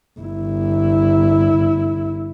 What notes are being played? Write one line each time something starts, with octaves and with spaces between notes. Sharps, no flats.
G1 E4